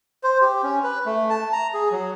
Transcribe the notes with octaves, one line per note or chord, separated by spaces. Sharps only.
C5
G4
C#4
B4
A3
A5
A#5
G#4
F#3